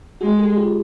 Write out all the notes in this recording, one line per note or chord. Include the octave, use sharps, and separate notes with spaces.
G#3 F#4 G#4
G4 A4
G#4
F4 G4